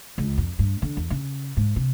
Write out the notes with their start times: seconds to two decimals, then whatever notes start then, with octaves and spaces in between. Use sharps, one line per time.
0.18 C#2
0.37 F2
0.59 G2
0.82 D3
0.97 E2
1.10 C#3
1.57 G#2
1.76 C3